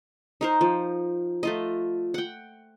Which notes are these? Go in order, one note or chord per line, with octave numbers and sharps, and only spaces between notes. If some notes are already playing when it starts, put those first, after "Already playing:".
D#4 A#4 C5
F3
A3 F4 D#5
F#5 G5